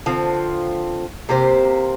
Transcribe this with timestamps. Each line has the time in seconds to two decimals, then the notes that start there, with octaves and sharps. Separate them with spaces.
0.06 D3 F3 C4
1.29 C3 A#3 G4 C5